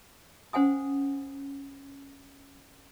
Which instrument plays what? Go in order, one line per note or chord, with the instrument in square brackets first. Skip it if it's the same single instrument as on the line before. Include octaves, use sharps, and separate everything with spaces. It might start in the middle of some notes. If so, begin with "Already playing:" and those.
[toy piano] C#4 C5 F#5 G#5 D#6